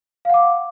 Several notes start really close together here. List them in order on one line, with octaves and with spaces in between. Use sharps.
F5 F#5 D6